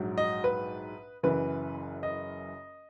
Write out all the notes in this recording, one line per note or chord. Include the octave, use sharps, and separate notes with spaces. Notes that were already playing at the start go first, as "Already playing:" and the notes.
Already playing: A#1 G#2 F#3
D#5
B4
F#1 F#2 E3 B4
D#5